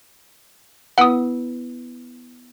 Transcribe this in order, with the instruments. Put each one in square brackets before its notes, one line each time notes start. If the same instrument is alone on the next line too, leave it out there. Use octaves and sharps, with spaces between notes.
[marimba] B3 E4 B4 [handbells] F#5 D#6